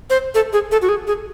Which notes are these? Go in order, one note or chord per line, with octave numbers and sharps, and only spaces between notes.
C5
A4
G#4
A4
F#4
G#4
G#4